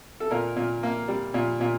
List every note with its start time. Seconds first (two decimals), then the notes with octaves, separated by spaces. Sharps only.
0.20 A4
0.31 A#2 A#4
0.56 A#2
0.83 A#3
1.08 G3
1.34 A#2
1.61 A#2